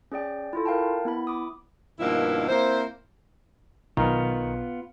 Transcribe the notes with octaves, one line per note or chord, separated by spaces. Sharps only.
C#4 G#4 D5 G5
E4 F4 A4
A#4 F5 G5 A5
B3 E4 B5
D6 D#6
G2 B2 D#3 F3 A#3 E4
A#3 C4 E4 C5
B1 D#3 B3 F4